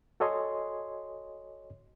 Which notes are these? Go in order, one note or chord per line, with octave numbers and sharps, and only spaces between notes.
F#4 A4 C#5 D#5 G#5 C6